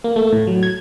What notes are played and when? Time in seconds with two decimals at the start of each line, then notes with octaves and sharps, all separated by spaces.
0.04 A#3
0.16 A3
0.33 A2
0.47 F#3
0.63 G#6